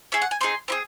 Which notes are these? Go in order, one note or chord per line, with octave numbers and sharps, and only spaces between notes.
C#4 G#4 E5
F#5
G#5
C4 D#4 G#4 C6
C4 E4 G#4